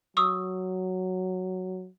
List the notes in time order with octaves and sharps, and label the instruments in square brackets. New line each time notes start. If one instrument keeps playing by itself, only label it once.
[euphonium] F#3 [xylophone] C#6 D#6 E6